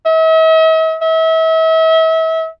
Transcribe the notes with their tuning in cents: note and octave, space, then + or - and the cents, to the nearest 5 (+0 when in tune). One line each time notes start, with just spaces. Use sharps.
E5 -45
E5 -35